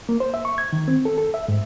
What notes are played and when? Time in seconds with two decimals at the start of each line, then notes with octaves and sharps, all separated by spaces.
0.09 A#3
0.20 C5
0.34 E5
0.45 C#6
0.58 G#6
0.73 D#3
0.88 C4
1.05 A4
1.18 A4
1.34 E5
1.48 G#2